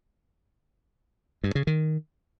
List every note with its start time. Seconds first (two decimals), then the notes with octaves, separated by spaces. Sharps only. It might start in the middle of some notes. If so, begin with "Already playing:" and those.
1.44 G2
1.55 C#3
1.67 D#3